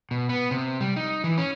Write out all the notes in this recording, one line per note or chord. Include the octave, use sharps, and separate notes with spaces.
B2
B3
C3
G3
D#4
E3
C#4